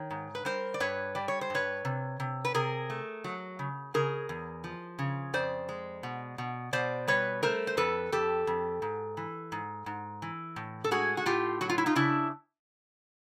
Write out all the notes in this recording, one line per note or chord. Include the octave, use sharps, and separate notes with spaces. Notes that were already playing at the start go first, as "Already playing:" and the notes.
Already playing: D#3 C#5
G#2
B4
G3 A#4 C5
D5
G2 B4 C#5
G3 D5
C#5
C5
G2 B4 C#5
C3
C3
B4
C3 G#4 A#4
A3
F#3
C#3
C#3 G#4 A#4
E2
F3
C#3
F2 C5 D5
G#3
B2
B2
B2 C5 D5
G3 B4 C#5
A3 A#4 C5
C5
F2 A4 B4
F2 G4 A4
F2
G#2
E3
G#2
G#2
E3
A2
A4
G#3 F#4 G#4
F#4
A2 F4 G4
F#3 F#4
F4
E4
D#4 F4
C#3 D4 E4